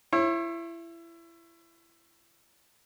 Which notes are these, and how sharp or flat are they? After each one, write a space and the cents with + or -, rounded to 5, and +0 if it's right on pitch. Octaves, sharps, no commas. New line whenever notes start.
E4 +25 C#5 -40